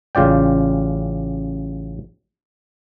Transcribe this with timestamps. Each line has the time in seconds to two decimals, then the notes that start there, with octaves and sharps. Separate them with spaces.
0.15 A1 C#3 F4 D5 G5